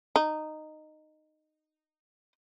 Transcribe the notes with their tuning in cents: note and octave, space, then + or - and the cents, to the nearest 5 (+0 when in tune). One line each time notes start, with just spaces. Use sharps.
D#4 -10